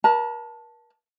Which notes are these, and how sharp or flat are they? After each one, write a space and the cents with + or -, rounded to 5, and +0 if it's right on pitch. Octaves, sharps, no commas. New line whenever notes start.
A#4 +40 A5 +0